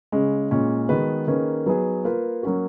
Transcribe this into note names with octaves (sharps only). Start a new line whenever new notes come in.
C#3 G#3 C#4
A#2 G#3 C#4
D#3 G#3 B3 F#4 B4
D#3 A#3 C#4 G#4 B4
F#3 B3 D#4 G#4 B4
A#3 F4 B4
F#3 A#3 C#4 F#4